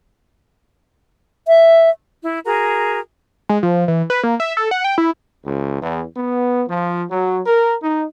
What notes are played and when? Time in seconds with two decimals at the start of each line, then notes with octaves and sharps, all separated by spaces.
1.48 E5
2.23 E4
2.44 F#4 G#4 A#4 A#5
3.49 G#3
3.63 F3
3.88 E3
4.10 B4
4.23 A#3
4.40 E5
4.57 A4
4.71 F#5
4.84 G5
4.98 E4
5.43 C#2
5.81 E2
6.15 B3
6.66 F3
7.09 F#3
7.45 A#4
7.82 D#4